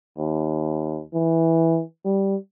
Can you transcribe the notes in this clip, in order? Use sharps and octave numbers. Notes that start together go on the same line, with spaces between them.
D#2
E3
G3